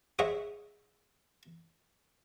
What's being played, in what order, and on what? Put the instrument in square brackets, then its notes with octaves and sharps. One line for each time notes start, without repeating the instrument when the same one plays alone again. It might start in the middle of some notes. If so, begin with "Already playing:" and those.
[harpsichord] G#4 C5 C#5 D#5 E5 F#5